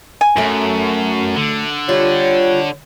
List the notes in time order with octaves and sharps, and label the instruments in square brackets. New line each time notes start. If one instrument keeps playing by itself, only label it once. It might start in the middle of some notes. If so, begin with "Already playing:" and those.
[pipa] G#5
[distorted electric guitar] F#2 [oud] F#3 A3
[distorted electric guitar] D3
[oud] G3 F4 [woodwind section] C#5